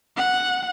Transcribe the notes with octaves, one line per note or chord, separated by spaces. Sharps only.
F#5